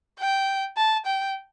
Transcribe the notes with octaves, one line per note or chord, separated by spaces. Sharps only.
G5
A5
G5